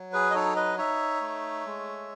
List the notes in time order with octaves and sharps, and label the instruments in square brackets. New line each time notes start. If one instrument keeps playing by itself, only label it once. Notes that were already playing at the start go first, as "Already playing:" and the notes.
Already playing: [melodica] F#3
G#4 B4
D#5
D#4 A4 C#5
B4 D#5
D#4 C#5 E5
A3
G#3